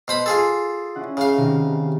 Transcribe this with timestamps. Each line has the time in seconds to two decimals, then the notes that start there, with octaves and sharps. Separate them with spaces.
0.08 B2 C5 B5
0.26 F4 G#4 A4
0.95 C#4 E4 F#5
1.17 C#3 F5 F#6
1.37 C3 D#3